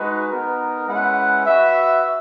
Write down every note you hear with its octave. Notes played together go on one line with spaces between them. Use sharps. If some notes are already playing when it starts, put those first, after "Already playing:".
Already playing: G#3 D#4 F#4 B4
B3 D#4 A#4
G#3 C#4 E4 B4 F#5
F#4 B4 E5